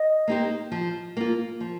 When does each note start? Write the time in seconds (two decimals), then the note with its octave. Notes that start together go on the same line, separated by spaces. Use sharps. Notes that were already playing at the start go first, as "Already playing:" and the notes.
Already playing: D#5
0.28 A#3 D#4 G4 C5
0.72 F3
1.17 A#3 F4
1.60 F3